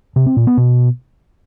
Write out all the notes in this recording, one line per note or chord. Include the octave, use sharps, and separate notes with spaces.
C3
C4
A#2
B3
B2